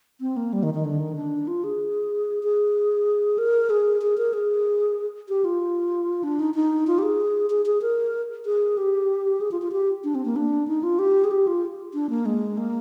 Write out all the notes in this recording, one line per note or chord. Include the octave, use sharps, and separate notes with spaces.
C4
A#3
G3
D#3
D#3
D3
D#3
D4
F4
G#4
G#4
A#4
G#4
G#4
A#4
G#4
G4
F4
D4
D#4
D#4
F4
G4
G#4
G#4
G#4
A#4
G#4
G4
G#4
F4
F4
G4
D4
C4
A#3
D4
D#4
F4
G4
G#4
G4
F4
D4
A#3
G#3
A#3